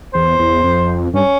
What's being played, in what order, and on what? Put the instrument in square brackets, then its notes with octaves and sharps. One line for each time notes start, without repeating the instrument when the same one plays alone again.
[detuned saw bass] E2 [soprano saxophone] C5
[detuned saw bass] E2
F2
[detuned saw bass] G2 [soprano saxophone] C#4